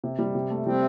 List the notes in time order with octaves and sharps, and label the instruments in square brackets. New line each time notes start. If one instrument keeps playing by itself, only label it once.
[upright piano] C3
G3
C3
A3
[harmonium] C3 C4 [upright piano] G3